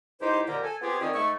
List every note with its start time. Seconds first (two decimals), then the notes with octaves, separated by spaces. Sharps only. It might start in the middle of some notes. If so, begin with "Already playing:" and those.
0.21 C#2 D#4 E4 G4 C5
0.48 F2 A#2 D3 G4 A#4 A#5
0.63 A4 G#5
0.81 B3 C4 F4 G4 G#4
1.01 D3 D#3 C4 C#4 G#5 D#6
1.14 G#2 A3 C#6